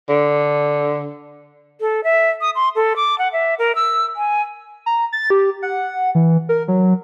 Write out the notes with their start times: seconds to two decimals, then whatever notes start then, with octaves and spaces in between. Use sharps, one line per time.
0.09 D3
1.81 A4
2.04 E5
2.41 D#6
2.55 C6
2.76 A4
2.96 D6
3.19 F#5
3.33 E5
3.59 A#4
3.75 E6
4.17 G#5
4.86 A#5
5.13 A6
5.30 G4
5.62 F#5
6.15 E3
6.49 A#4
6.68 F#3